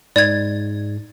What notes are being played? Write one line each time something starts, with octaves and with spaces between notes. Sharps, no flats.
G#2 D5 G#6